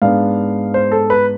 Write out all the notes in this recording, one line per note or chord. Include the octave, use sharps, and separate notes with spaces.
G#2 G#3 B3 D4 F5
C5
A4
B4